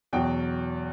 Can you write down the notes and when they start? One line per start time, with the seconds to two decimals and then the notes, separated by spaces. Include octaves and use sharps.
0.13 E2 B2 F#3 G5